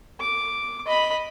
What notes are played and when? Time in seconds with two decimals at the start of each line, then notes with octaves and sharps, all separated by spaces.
0.21 D6
0.87 D#5 B5